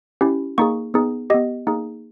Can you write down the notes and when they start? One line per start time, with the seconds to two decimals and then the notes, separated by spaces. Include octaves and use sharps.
0.21 C#4 E4 G4
0.58 A#3 D#4 G#4 C#6
0.94 B3 D#4 G#4
1.30 B3 G4 D#5
1.67 A#3 D#4 G#4